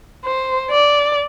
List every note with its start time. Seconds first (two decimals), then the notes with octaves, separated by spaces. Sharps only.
0.24 C5
0.70 D5